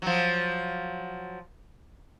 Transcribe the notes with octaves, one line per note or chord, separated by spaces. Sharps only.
F3 F#3